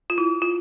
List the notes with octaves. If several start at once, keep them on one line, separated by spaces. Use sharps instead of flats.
F4
E4
F4